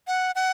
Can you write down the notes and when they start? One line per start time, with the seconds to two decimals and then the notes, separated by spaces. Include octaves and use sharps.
0.07 F#5
0.35 F#5